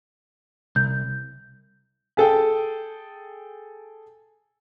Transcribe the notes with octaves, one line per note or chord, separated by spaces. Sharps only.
C2 G6
G#4 A4 G5